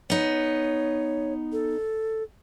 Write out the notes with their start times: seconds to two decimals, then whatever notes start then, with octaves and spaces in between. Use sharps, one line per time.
0.10 B3 D#4 C#5
1.52 A4